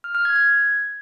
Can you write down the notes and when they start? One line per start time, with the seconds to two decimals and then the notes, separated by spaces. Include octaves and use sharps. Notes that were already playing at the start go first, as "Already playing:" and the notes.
0.04 F6
0.15 F6
0.25 G#6
0.36 G#6